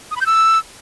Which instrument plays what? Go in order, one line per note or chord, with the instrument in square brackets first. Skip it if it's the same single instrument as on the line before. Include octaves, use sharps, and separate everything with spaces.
[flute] D#6
B5
G6
E6